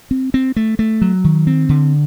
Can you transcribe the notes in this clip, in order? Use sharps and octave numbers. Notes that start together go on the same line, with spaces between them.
C4
C4
A3
A3
F#3
D#3
C4
D3